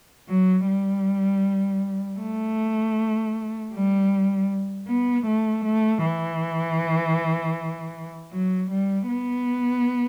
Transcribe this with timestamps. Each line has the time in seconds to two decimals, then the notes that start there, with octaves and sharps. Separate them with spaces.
0.29 F#3
0.67 G3
2.20 A3
3.73 G3
4.87 B3
5.26 A3
5.64 A3
6.03 E3
8.32 F#3
8.70 G3
9.08 B3